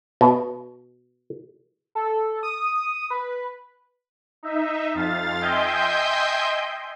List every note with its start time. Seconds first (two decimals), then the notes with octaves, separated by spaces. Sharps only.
0.21 B2
1.95 A4
2.43 D#6
3.10 B4
4.43 D#4 E5
4.95 F2 F5 A6
5.41 D#5 E5 G5 G#5 C6 G6